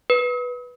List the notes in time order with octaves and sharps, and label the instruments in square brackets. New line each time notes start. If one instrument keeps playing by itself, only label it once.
[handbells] B4